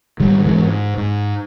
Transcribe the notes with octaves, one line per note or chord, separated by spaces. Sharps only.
G#2 D#3 G3
E3 G#3
G#2
G#2